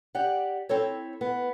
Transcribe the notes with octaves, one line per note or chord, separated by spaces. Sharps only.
G4 D5 F#5
C4 E4 A4 C#5
B3